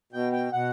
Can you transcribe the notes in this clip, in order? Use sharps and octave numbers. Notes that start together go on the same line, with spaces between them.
B2 G5
G5
B2 F#5